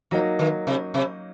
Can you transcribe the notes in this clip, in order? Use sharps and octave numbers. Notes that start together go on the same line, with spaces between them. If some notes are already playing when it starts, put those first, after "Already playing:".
F3 F#3 A#3 D#4
D#3
C3
C3